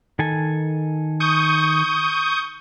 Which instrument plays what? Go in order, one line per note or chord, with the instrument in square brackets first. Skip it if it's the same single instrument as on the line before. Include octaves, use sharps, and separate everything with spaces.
[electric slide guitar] D#3 A4 G#5
[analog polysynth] C#6 D#6 G6